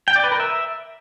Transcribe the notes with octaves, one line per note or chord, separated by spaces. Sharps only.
G5
D5
B4
A#4
E5